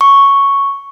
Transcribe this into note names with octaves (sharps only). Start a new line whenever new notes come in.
C#6